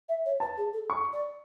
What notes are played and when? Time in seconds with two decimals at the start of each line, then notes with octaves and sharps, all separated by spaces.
0.09 E5
0.25 C#5
0.40 B4 A5
0.57 G#4
0.73 A4
0.90 C#6
1.13 D5